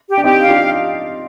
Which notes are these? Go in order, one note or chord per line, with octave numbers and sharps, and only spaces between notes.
G4
D4
C4 D#4 G4
F5
D4 F4